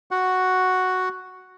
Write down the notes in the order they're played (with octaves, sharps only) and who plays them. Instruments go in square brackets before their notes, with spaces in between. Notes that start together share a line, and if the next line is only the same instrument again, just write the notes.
[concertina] F#4 F#5